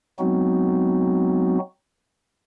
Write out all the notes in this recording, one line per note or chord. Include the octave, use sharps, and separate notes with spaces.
F#3 G#3 B3 C4 D#4 F#4